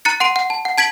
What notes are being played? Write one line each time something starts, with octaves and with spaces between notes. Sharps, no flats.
A#5 F#6 A6 C#7
F#5 C6 D7 D#7
F#5
A5
F#5
A5 G#6 B6 D7 F#7